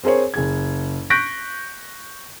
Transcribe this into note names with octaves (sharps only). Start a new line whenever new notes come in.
C4 G#4 A#4 C5 C#5
F#1 G#4 G#6
C#6 F#6 G6 A#6 B6 D7